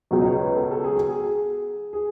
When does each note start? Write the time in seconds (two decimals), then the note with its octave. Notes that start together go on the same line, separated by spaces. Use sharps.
0.11 C#2 B2 F#3 D#5
0.22 D#5
0.25 C#5
0.41 B4
0.55 A4
0.71 A4
0.84 G#4
0.96 F#4
1.09 G#4
1.93 G#4